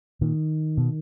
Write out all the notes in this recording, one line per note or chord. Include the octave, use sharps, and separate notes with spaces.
A#2 D#3
B2